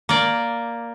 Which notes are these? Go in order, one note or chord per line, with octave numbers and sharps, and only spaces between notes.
A#3 D5